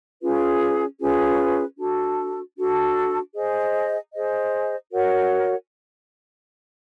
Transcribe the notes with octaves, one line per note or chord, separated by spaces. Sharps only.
C#4 F4 G#4 B4
C#4 F4 G#4 B4
D4 F#4 A4
D4 F#4 A4
G#4 C5 D#5
G#4 C5 D#5
F#4 A#4 C#5 F#5